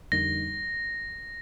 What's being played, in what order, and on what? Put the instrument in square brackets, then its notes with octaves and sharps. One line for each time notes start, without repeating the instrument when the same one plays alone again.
[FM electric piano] F2 D3 G3 A#3 D#4 [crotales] A#6